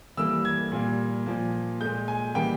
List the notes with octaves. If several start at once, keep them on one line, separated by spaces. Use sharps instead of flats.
E3 G3 A#3 E6
G#6
A#2 G3 A#3
A#2 F3 A#3
A#2 G#3 G6
G#5
C#3 E3 G3 A#3 G5